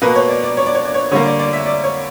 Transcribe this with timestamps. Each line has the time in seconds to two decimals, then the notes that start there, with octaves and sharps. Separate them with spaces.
0.02 B2 A#3 B4
0.16 C#5
0.29 D5
0.44 D5
0.57 C#5
0.66 D5
0.75 C#5
0.85 D5
0.94 C#5
1.11 D3 G3 A#3 C#5
1.25 D5
1.39 D5
1.53 E5
1.66 D5
1.84 C#5